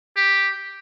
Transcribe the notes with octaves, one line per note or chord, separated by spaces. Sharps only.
G4